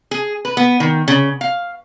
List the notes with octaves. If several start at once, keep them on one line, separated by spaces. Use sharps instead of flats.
G#4
B4
B3
D#3
C#3
F5